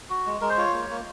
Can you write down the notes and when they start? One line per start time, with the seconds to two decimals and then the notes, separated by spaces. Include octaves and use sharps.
0.09 F#4
0.26 G#3
0.41 G#3 A#4
0.50 C5
0.57 F4 C#5
0.74 A#3
0.90 A#3